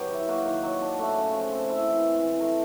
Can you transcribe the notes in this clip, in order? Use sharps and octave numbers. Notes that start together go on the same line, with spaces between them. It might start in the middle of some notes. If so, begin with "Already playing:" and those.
Already playing: F#3 B3 G4
E4
A#3 F#4
D#3
F#3
D4
A3
C#3
F3
C4
C4 E4
E3
G#3
E3
A3 A#4